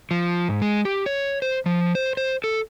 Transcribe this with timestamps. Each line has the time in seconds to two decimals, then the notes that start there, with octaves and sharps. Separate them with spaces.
0.11 F3
0.49 G#2
0.62 G#3
0.85 G4
1.06 C#5
1.42 C5
1.66 F3
1.95 C5
2.17 C5
2.44 A4